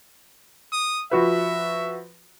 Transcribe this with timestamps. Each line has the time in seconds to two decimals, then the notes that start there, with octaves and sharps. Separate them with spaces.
0.72 D#6
1.11 F3 F#4 B4 E5